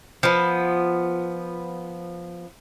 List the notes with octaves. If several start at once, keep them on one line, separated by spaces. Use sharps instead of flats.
F3 B3